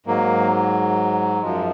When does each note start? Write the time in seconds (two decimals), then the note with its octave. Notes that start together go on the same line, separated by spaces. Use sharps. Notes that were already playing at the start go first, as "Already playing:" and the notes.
0.06 G#2 F#3 A#3
1.42 F#2 F3 G#3